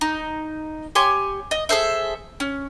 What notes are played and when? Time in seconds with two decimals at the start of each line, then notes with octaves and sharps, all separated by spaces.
0.01 D#4
0.95 G4 C#5 G#5 C6
1.51 D#5
1.69 G#4 A4 C5 E5
2.40 C#4